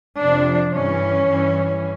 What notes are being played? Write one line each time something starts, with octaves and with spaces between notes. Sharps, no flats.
F2 C3 F3 D4
G2 E3 C#4
G2 E3